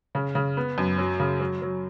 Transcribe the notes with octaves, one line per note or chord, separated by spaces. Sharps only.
C#3
C#3
B3
F#2
F#3
C#3
F#3
F#3